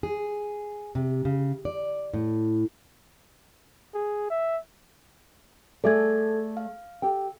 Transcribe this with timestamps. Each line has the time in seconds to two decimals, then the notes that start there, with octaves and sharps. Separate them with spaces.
0.03 G#4
0.95 C3
1.25 C#3
1.65 D5
2.14 A2
3.94 G#4
4.30 E5
5.84 A3 G#4 A4 D5 E5 G#6
6.57 F5
7.02 G4 A4 G5